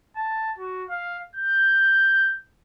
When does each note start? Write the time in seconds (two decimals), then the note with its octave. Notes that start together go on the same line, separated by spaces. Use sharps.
0.16 A5
0.59 F#4
0.89 F5
1.36 G6